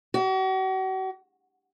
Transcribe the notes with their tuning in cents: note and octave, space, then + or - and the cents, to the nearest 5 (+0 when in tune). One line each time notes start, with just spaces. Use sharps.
F#4 +40